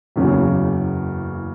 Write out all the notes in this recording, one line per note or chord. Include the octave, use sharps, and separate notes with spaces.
F#1 E2 C#3 F#3 C#4